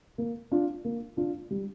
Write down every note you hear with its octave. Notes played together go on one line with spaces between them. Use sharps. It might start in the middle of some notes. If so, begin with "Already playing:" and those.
A#3
D4 F4
A#3
D4 F4
G3